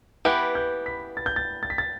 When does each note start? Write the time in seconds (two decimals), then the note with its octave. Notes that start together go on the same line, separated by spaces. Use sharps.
0.25 E3 B3 G4 B4 G6
0.55 G6
0.86 B6
1.17 A6
1.26 G6
1.36 A6
1.63 A6
1.70 B6
1.78 A6